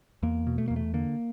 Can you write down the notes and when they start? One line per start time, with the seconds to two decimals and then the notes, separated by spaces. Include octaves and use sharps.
0.23 E2 A#3
0.47 B2
0.58 A3
0.68 E2 A#3
0.76 A3
0.94 D3 A#3